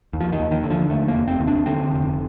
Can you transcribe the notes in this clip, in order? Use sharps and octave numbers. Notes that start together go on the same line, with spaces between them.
D#2
F3
D#3
D#2
D#3
D3
F3
D#2 A3
A#3
F1
C4
D#2
D4
D3 C4
F1